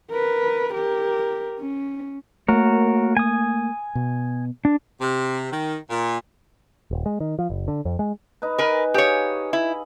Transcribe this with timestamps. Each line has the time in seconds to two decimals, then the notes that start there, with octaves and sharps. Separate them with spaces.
0.10 A#4 B4
0.74 G4 A#4
1.59 C#4
2.48 A3 A#3 F#4 A#4 C#5
3.17 G#5 D#6
3.95 B2
4.65 D4
5.01 C3
5.52 D#3
5.90 A#2
6.91 D#1
7.06 G#3
7.20 D#3
7.39 F3
7.50 F#1
7.68 D3
7.85 F2
7.99 G#3
8.42 D#4 B4
8.58 A#4 B4 G#5
8.94 G4 G#4 C#5 F5
9.53 E4